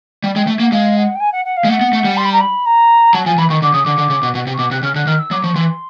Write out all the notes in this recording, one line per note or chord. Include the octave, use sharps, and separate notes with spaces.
G3 G5
G#3 G5
A3
A#3 F#5
G#3 F5
F#5
G5
G#5
F#5
F#5
F5
G#3
A3 F#5
B3
A3
G3
C6
B5
A#5
B5
A#5
F#3 A5
F3 G#5
E3 B5
D#3 C#6
D3 D6
C#3 D#6
D3 D6
D3
C#3
B2
B2
C3
C#6
B2 D6
C3 F#6
C#3 F6
D3 F#6
D#3 F6
E6
F#3 D6
F3 C#6
E3 C6